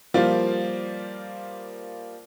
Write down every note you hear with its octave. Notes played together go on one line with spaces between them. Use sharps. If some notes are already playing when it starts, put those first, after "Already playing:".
F3 G3 A#3 F4 D5